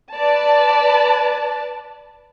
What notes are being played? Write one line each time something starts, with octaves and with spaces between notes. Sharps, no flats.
B4 D5 A5